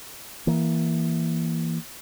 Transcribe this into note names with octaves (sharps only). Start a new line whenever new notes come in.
E3 A#3